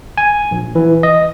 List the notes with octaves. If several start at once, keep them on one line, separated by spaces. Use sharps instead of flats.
G#5
A#1
E3
D#5